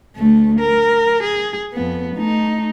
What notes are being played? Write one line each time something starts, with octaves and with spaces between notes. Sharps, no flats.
D2 A3
A#4
G#4
F2 B3
A3 D#4